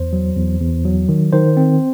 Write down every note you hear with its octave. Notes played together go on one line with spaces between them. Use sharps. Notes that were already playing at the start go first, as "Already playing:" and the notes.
Already playing: E2 C5
F#3
E2
E2
F#3
D#3
D#3 C5
C4